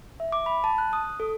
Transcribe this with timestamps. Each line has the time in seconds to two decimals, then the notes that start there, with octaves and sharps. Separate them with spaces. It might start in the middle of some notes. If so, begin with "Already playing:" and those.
0.20 E5
0.32 D6
0.46 B5
0.64 A5
0.78 F#6
0.93 D#6
1.20 A4